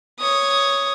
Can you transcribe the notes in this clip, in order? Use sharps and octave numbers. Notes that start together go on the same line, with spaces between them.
C#5 D#6